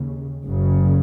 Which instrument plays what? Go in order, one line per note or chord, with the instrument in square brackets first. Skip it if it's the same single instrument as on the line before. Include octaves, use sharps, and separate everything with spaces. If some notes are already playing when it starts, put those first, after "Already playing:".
Already playing: [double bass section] D#2 C#3
F#1 F#2 C#3